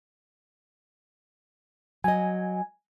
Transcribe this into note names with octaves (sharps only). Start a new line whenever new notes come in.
F#3 D#5 G#5